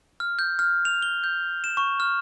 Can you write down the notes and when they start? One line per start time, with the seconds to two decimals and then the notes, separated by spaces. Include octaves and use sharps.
0.20 F6
0.39 G6
0.59 F6
0.85 F7
1.02 G7
1.24 G6
1.64 E7
1.77 C#6
2.00 F6